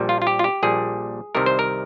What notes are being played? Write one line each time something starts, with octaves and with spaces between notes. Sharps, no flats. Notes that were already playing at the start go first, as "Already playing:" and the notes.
Already playing: A#1 A#2 G3
F4
F4
G4
F4
G4
A#1 A#2 G3 G#4
C2 C3 D#3 G3 A#4
C5
A#4